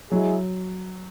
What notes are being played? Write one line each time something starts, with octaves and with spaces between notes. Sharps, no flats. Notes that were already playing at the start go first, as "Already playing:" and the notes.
F#3 G#3 E4 G#4